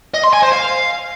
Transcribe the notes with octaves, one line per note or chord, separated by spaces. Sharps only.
D#5
C6
G#5
C5
F5